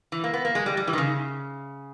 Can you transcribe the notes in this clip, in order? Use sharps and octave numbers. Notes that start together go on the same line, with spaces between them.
E3
A#3
B3
A#3
G#3
G3
G3
E3
D#3
C#3